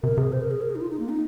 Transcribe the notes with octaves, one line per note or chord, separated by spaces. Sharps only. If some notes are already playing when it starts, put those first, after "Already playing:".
C3 A#4
C3 G#4
C5
A#4
G#4
A#4
G#4
D#4
F4
D#4
A#3
D#4